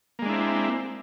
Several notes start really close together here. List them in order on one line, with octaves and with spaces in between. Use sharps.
A#3 G#3 D4 E4 C4